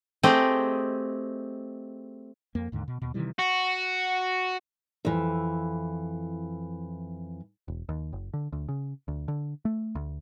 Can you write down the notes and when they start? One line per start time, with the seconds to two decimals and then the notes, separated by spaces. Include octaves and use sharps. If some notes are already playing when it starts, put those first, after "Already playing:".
0.23 A3 C4 G4 G#4 D#5
2.55 F2 A#3
2.72 D#2 G#2 D3
2.88 B2
3.02 D#2 B2
3.14 C3 D#3 E3 G3
3.39 F#4
5.05 F2 E3
7.68 E1
7.89 D#2
8.13 F#1
8.34 D3
8.53 D2
8.69 C#3
9.08 D2
9.28 D3
9.65 A3
9.95 D2